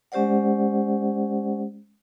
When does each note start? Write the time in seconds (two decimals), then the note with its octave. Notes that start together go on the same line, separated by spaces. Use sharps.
0.12 G#3 C#4 G4 C5 D5 F#5